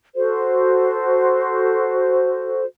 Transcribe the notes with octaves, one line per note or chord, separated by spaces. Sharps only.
F#4 A4 C5